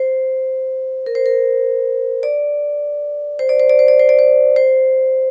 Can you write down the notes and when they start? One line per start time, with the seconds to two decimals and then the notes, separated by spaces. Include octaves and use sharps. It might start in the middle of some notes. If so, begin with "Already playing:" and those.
Already playing: C5
1.06 A#4
1.15 C5
1.26 A#4
2.23 D5
3.39 C5
3.49 D5
3.60 C5
3.69 D5
3.79 C5
3.88 D5
3.99 C5
4.09 D5
4.19 C5
4.56 C5